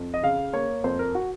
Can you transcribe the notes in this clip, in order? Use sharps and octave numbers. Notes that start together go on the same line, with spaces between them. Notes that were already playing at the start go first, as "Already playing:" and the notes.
Already playing: F2
D#5
C#3 F5
A#3 C#5
F2 C5
A#4
F#4